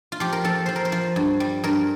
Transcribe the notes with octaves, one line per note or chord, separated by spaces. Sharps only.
F4
F3 G4
A#4
F3 A4
F3 C5
A#4
C5
F3
G2
G3
G2 A#4